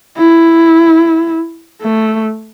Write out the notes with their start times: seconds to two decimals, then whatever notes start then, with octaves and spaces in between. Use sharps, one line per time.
0.17 E4
1.82 A3